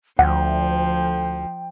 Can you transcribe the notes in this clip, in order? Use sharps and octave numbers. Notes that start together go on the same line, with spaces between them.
D2 F3 F#5 G5